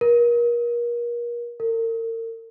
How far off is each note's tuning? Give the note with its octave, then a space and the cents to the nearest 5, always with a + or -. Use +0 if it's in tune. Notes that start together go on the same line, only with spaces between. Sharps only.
A#4 +35
A#4 -40